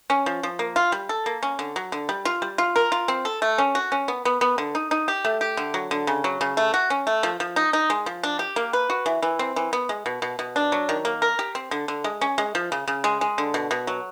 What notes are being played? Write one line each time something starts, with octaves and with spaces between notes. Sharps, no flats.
C#4
F3
F3
A#3
F4
G3
A4
A#3
C#4
D3
F#3
D3
G3
F4
G3
F4
A#4
F4
C4
A4
A3
C#4
F#4
C#4
B3
B3
B3
D3
D#4
D#4
G4
A3
G4
D3
F#3
D3
C#3
F#3
C#3
A3
F#4
C#4
A3
F3
F3
D#4
D#4
G#3
F3
D4
G4
A#3
B4
F#4
E3
E3
C4
E3
B3
G#3
B2
B2
B2
D4
F#3
D#3
A#3
A#4
G4
C4
D3
D3
G#3
C#4
G#3
F3
C#3
C#3
G#3
G#3
D3
B2
B2
F#3